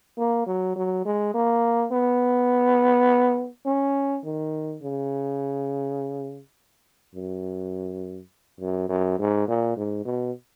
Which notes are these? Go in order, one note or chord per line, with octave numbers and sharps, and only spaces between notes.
A#3
F#3
F#3
G#3
A#3
B3
C#4
D#3
C#3
F#2
F#2
F#2
G#2
A#2
G#2
B2